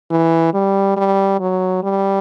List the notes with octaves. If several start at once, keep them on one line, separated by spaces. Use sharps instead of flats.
E3
G3
G3
F#3
G3